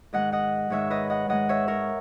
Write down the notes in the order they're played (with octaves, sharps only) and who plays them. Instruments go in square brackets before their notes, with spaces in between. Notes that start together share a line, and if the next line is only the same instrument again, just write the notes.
[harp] G#2 D#3 G#3 D#5 F#5
D#5 F#5
G#2 D#3 G#3 C#5 E5
B4 D#5
D#5 F#5
G#2 D#3 G#3 D#5 F#5
C#5 E5
A#4 C#5